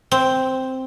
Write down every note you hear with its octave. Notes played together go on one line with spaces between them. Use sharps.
C4